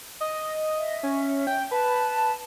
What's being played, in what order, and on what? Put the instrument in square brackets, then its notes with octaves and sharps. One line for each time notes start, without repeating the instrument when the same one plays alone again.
[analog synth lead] D#5
[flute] E5
[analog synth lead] C#4
G5
[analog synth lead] B4 [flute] A5